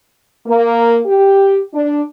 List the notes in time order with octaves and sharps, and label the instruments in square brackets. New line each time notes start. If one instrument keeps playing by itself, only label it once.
[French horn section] A#3
G4
D4